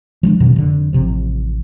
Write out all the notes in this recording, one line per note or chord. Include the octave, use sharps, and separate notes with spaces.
F3 G#3 C#4 D4
F2 B2 D#3 F#3
F1 D3
A1 C3 F3